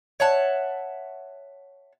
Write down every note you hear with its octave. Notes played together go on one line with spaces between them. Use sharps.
C#5 E5 F#5 A5